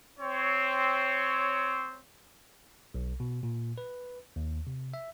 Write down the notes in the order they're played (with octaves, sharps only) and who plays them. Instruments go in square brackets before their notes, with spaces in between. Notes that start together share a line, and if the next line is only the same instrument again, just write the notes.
[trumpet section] C4 C#5
[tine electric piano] B1
B2
A#2
B4
D#2
C3
E5